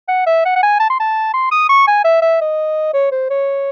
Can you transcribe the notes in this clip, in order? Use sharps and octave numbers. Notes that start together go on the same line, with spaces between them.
F#5
E5
F#5
F#5
G#5
A5
C6
A5
C6
D#6
C#6
G#5
E5
E5
D#5
C#5
C5
C#5